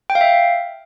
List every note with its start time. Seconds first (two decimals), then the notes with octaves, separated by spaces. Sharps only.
0.10 G5
0.15 F5
0.21 E5